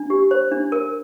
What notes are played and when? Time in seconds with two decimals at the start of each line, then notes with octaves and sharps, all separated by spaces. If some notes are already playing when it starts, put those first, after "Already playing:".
Already playing: D4
0.10 G4
0.31 C5
0.52 D4
0.72 A#4